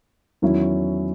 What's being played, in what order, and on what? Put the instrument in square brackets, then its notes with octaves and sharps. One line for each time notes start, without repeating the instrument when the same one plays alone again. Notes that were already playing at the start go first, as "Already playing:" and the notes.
[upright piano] E2 D#3 F#3 C#4 E4